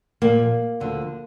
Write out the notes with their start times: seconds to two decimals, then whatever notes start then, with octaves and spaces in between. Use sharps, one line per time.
0.22 A#2 F3 A#3
0.80 D2 D3 F3